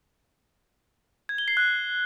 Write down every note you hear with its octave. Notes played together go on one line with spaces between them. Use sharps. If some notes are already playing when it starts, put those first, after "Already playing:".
G#6
G7
C7
F#6